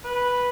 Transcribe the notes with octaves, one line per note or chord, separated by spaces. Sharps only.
B4